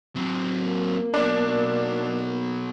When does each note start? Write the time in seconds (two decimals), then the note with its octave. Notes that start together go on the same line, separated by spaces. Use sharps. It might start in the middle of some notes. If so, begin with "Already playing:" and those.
0.16 F#3 C4
0.64 A#3
1.14 B2 F#3 D4